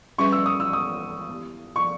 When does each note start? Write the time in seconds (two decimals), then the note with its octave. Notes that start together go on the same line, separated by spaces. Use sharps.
0.18 G3 C#4 G#4 B4 E5 C#6
0.32 E6
0.46 D#6
0.60 E6
0.73 D#6
1.29 B3 E4 G4
1.76 C#6